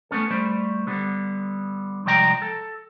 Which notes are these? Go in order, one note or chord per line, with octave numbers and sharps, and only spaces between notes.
A3 B3 C#4 A4
G3 A3 B4 C5 D5
D3 G3 B3
C2 F3 G#3 D5 G5 A#5
A4